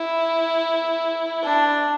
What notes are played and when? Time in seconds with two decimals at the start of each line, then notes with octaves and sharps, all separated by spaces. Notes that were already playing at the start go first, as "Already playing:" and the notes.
Already playing: E4
1.42 D4